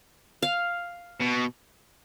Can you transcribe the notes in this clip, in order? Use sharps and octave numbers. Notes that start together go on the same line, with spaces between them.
F5
B2